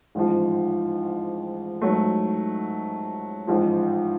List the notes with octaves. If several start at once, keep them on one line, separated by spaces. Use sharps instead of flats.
A1 G#2 F3
G#2 F#3 A3
A1 G#2 F3